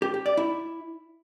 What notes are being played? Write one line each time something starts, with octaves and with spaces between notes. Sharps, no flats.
G4
G4
D5
E4